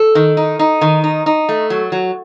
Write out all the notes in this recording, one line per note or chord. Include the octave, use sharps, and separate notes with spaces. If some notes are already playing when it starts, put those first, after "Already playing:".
Already playing: A4
D#3
D#4
D#4
D#3
D#4
D#4
A3
F#3
F#3